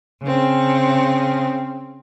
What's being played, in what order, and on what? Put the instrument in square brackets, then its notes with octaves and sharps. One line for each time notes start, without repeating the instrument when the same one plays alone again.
[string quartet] C#3 C4